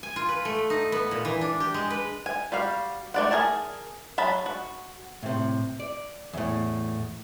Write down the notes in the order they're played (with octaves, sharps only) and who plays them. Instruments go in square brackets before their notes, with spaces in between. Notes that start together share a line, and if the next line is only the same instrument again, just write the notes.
[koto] G#5
F4
B4
A3
D#4
B3
A#2
E3
D4
G4
G#3
B4
[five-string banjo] G#5
G3 F#4 F5
A3 D5 F#5
G#4 A#4 G#5 A5
F#3 G#4 A5 B5
F#4
[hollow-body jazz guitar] A2 C3
D5
E2 A2